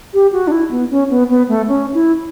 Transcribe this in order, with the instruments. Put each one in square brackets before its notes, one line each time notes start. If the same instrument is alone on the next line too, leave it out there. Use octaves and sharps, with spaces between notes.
[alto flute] G4
F#4
D4
E4
B3
C#4
B3
B3
A3
C#4
E4